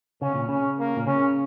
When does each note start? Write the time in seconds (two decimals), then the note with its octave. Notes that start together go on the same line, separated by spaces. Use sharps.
0.22 C#3 C#4
0.35 A#2
0.49 C#3 C#4
0.79 A#3
0.97 A#2
1.07 C#3 C#4